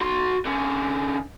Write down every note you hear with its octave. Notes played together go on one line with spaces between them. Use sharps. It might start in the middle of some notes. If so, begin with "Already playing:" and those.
F#4 C6
D3 C#4